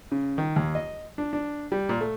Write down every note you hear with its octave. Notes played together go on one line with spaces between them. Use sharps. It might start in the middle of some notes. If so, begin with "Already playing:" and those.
C#3
D#3
D#2
D#5
D4
D4
G3
A#2
A3